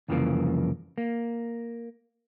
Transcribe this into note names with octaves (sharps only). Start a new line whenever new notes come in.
C2 F2 C#3 E3 F3 A#3
A#3